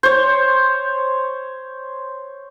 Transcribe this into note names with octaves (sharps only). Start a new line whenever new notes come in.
C5 C#5